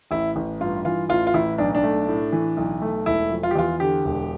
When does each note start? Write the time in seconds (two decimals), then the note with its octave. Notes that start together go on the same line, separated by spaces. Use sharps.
0.11 A1 E4
0.36 A1
0.61 G2 F4
0.85 E3 F4
1.09 A1 F4
1.27 F4
1.34 A1 E4
1.58 B1 D4
1.75 D4
1.83 A3
2.08 A2
2.32 E3
2.57 B1
2.82 A3
3.06 E1 E4
3.30 F3
3.43 F4
3.51 G4
3.55 E2 F4
3.80 D3 G4
4.05 E1